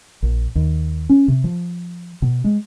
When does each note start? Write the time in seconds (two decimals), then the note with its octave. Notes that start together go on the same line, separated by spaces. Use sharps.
0.23 A#1
0.55 D#2
1.09 C#4
1.28 C3
1.44 F3
2.22 B2
2.44 G#3